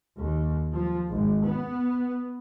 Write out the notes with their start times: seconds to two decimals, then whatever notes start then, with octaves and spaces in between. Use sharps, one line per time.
0.17 D#2
0.72 F3
1.10 G#1
1.47 B3